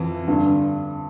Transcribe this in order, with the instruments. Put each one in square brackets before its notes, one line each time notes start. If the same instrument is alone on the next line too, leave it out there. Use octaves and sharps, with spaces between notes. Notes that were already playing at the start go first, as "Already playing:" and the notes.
Already playing: [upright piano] F2 E3
G2 D3